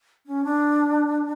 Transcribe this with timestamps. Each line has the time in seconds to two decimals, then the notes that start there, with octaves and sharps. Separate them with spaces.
0.26 C#4
0.44 D4